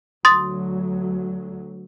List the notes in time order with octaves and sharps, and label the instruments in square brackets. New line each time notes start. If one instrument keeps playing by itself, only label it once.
[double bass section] D2 F#3 [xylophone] C6 D#6 A6